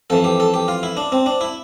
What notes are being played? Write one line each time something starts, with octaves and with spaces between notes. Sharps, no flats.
F2 E3 A4
G4
A4
G4
F4
E4
D4
C4
D4
E4